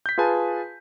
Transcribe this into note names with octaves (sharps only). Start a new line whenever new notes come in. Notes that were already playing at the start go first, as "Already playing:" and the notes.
G6 B6
F4 G#4 B4 G#5 A5